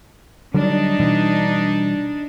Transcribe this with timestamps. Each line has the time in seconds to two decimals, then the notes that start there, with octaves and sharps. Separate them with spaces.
0.54 D3 F#3 G3 D4 D#4
1.00 B2 E3 G3